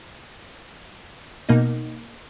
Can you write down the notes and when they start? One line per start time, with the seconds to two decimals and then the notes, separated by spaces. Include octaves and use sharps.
1.49 B2 A#3 D#4